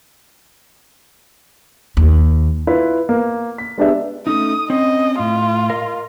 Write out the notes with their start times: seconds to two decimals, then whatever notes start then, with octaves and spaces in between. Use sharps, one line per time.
1.97 D#2
2.67 E4 F4 B4
3.09 A#3
3.58 B6
3.78 G#3 B3 D4 G4 D5 E5
4.27 A3 C#4 D#4 D#6
4.70 C4 C#4 D#5
5.19 A2 F4
5.70 A#4 D#5 F5